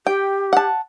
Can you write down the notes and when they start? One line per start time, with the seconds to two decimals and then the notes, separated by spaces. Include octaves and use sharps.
0.07 G4 G5
0.53 F#5 A5